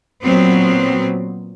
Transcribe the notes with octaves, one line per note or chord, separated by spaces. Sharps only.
A#2 F#3 B3 C4